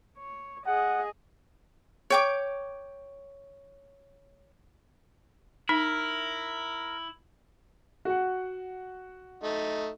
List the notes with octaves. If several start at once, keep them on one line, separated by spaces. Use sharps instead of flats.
C#5
G#4 D#5 F#5
C#5 G5 D6
D#4 E4 A#4
F#4 F#5
A3 D#4